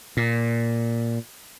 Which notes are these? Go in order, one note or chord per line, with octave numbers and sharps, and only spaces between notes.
A#2